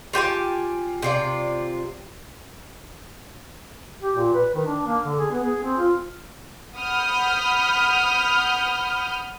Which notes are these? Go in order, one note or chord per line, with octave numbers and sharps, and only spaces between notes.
F4 G4 G#5 A5
C3 F4 D5
G4
A#2
B4
D#3
D4
A#3
D3
G#4
B3
G#4
C4
F4
F#5 B5 D#6 F6 G6